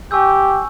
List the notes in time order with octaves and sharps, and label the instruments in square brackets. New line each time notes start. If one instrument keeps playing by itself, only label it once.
[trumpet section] G4 [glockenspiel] G#5 C#6 E6 G6